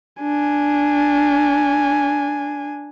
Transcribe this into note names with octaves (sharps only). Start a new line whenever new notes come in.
D4 G#5